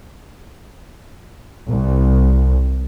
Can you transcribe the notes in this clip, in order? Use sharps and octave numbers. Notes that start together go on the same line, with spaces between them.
C2